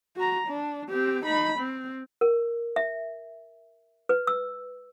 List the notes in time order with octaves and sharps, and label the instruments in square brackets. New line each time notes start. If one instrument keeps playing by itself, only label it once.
[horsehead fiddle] F#4 A#5
D4
C4 G4
D#4 B5
C4
[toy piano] A#4
E5
B4
E6